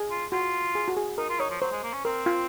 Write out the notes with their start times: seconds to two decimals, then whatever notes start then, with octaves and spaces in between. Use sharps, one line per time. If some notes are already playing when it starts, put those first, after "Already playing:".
Already playing: G#4
0.11 F4
0.32 F4 F#4
0.75 G#4
0.88 F#4
0.97 G#4
1.18 D#4 A#4
1.30 F4
1.40 D#4 C#5
1.50 F3
1.62 F#3 C5
1.72 G#3
1.84 A#3
1.93 C#4
2.05 C4 A#4
2.26 F4